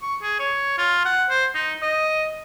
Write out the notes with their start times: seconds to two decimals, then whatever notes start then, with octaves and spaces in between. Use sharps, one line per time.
0.02 C#6
0.22 G#4
0.39 C#5
0.78 F4
1.05 F#5
1.30 C5
1.55 D#4
1.82 D#5